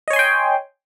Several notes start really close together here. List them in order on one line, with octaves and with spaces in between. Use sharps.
D#5 C#5 G#5 C6 G5